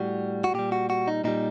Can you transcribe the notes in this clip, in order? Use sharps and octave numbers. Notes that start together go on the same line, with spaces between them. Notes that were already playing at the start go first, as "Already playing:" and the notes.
Already playing: A2 G3 F#4
F#4
A#2 G3 G4
F#4
F#4
D#4
A#2 G3 D#4